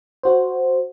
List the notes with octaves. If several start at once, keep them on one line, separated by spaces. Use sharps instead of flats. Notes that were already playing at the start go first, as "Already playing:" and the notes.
F#4 C5